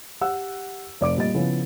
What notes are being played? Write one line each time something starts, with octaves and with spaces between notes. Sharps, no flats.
G4 F#5 E6
F1 D5 D6 D7
A#2 G3 D#5 A6
C#3 F3 B3 E4 G#4